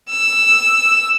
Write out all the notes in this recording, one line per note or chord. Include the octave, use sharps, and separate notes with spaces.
E6